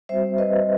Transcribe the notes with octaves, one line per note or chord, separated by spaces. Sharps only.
G3 C4 F#4 C5 E5
B4 D#5